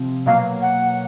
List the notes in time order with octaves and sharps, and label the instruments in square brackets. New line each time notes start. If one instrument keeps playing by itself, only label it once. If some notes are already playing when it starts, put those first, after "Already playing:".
Already playing: [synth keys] C3 F3 C4
[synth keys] B2 F#3 A#3 [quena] F5
[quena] F#5